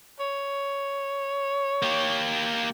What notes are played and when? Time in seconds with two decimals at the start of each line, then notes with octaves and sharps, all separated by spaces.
0.20 C#5
1.82 A#3 G4